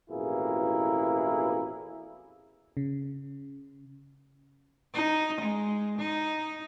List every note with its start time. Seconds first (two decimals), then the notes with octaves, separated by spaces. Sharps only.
0.11 A1 F2 B2 A#3 E4 G#4
2.77 C#3
4.94 D#4
5.41 G#3
5.99 D#4